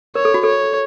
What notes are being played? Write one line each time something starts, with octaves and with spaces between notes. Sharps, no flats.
A#4 C#5
A4
F#4
A4 C#5